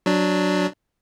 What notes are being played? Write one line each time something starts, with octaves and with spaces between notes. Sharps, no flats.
F#3 D4